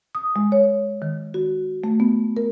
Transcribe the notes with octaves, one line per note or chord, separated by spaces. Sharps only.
D#6
G#3
C#5
D#3
F#4
A3
B3
A#4